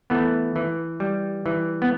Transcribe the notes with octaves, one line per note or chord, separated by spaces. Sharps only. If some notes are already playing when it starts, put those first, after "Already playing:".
E3 A3 B3
E3
G3
E3
B3